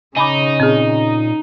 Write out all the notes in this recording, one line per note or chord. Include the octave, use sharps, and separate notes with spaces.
C#3 C#4 D#4 G#5 B5 D6
A#2 C4 G#4